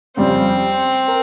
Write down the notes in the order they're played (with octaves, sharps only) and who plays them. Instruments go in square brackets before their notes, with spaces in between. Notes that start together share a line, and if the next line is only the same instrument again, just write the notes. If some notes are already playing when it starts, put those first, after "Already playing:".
[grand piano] F2 C#3 G3 [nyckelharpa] C4
[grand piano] A#4